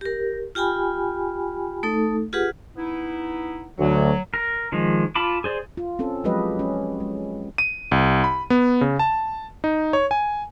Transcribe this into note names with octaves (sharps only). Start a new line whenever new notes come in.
G4 A#4
F4 G4 G5 G#5 B5
A3 D#4 A4
F4 G4 G#4 B4 F#5
B3 D#4 E4
D2 F#3
A#4
D#3 F3 G#3
F4 A5 B5 D6
G#4 C5 D5
F4
C4 C#4 A4
F3 F#3 G#3 G4 B4 D#5
C#4
G#3
D#7
C2
B5
B3
C#3
A5
D#4
C#5
G#5